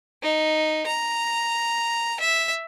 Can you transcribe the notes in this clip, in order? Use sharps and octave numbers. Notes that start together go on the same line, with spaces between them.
D#4
A#5
E5